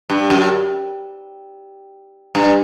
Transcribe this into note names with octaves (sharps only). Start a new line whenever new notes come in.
G2
F#2
G2